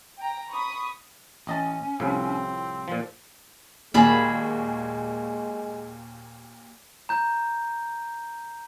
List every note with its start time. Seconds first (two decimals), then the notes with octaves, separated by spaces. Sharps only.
0.18 G5 A#5
0.49 B5 C#6 D#6
1.47 A1 C#4 D#5 A5
2.00 C2 A2 F3 C4
2.88 A#2 F3
3.94 D#2 A#2 G#3 A#3 F#4 G#4 A5 B5
7.09 A#5 G6